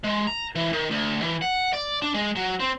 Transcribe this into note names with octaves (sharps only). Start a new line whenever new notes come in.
G#3
A#5
E3
D#3
D2
E3
F#5
D5
D4
G#3
F#3
C4